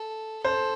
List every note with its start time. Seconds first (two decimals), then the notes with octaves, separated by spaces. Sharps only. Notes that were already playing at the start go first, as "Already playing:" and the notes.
Already playing: A4
0.44 A4 C5